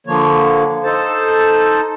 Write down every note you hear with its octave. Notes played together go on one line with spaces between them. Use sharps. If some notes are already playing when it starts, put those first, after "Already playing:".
D3 F3 A#3 C#5
D#4 A4 C5 A5